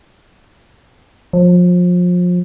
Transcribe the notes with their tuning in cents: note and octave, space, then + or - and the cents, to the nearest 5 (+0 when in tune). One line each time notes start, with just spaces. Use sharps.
F3 +30